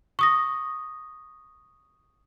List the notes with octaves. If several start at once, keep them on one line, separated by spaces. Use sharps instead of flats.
C#6 D#6 A#6